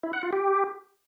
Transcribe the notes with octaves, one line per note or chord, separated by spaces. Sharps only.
E4
F#5
F4
G4